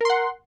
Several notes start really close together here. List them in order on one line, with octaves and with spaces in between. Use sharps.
A#4 C6 F#5